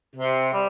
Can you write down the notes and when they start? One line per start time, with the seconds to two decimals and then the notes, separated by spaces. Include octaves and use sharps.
0.15 C3
0.51 G3